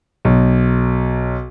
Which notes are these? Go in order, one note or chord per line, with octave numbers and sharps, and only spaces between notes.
B1